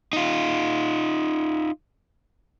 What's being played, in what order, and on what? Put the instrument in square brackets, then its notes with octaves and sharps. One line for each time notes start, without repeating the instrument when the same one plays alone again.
[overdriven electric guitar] D#4 F4